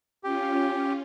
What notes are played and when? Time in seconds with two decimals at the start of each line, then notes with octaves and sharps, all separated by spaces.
0.24 C#4 F4 G4